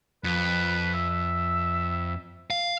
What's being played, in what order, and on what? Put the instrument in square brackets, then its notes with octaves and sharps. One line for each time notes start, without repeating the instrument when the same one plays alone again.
[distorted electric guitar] F2 [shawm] B4
[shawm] E5
[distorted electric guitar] F5